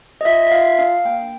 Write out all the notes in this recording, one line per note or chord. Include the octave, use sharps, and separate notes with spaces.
D#5
F4 E5
E5
F4 F5
D4 F5
A#3 G5